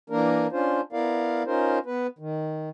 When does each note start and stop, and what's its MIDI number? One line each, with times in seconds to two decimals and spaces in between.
0.10 0.47 52
0.10 0.47 58
0.10 0.47 62
0.10 0.47 70
0.52 0.81 61
0.52 0.81 62
0.52 0.81 65
0.52 0.81 72
0.93 1.43 59
0.93 1.43 64
0.93 1.43 70
0.93 1.43 74
0.93 1.43 77
1.46 1.79 61
1.46 1.79 63
1.46 1.79 65
1.46 1.79 70
1.46 1.79 72
1.86 2.07 59
1.86 2.07 71
2.19 2.69 51